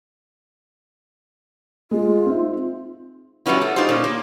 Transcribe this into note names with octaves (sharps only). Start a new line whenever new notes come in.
G#3 F4
C4 D#4 E5
A2 F#3 G3 B3 C#4 E4
A3
D#4 F4 G4 G#4 C5
A#2 C#4
A#3